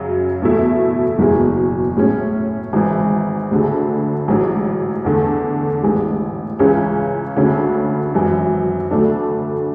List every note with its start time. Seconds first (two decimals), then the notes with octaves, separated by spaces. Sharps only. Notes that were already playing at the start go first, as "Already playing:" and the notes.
Already playing: F#2 C#3 F#3
0.42 E2 B2 A3 E4
1.19 F#1 E2 B2 G#3
1.97 A2 G#3 C#4
2.73 G#1 G#2 E3
3.51 D2 D3 G#3
4.28 A1 G#2 F#3
5.04 E2 D3 A3
5.83 A1 G#2 G#3
6.59 C#2 C#3 E3 G#3 C#4
7.36 D2 D3 G#3 C#4
8.14 G#1 F#2 E3
8.91 D2 D3 A3 D4